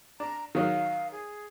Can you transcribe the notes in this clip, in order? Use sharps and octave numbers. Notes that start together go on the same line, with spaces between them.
D4 A#5
D#3 F#3 D#4 F5
G#4